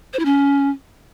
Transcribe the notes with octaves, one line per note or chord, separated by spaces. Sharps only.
C5
E4
C#4